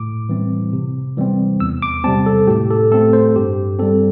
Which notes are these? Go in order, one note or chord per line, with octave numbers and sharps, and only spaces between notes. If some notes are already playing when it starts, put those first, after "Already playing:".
Already playing: A2 D6
E3 G3 C4
C3
E3 G3 C4
E2 E6
D6
C3 G3 C4 A5
A4
A2 G4
A4
A3 C4 A4
C5
G2 G4
G3 C4 A4